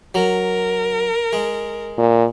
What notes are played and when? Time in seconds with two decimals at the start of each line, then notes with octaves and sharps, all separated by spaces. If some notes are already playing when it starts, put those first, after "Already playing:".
0.15 F#3 A#4
1.33 G#3
1.98 A#2